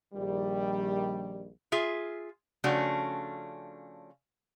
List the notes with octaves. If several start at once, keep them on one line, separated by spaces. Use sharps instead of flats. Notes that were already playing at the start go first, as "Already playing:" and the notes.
A#1 D#3 G3
F4 G#4 E5
C#3 F3 A3 C#4 D4 F#4